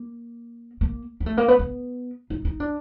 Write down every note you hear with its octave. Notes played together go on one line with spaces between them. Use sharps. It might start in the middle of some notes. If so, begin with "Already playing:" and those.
Already playing: A#3
A#3
A#3
A3
A#3
B3
B3
D#4
D#4
D4